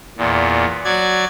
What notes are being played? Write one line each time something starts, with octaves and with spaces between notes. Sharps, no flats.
E2 A#2
F#3 D5 G#6